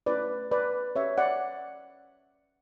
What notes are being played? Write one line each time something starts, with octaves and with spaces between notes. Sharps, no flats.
A3 C#4 E4 B4 D5
B4 D5
C#4 G4 C#5 E5
D5 F#5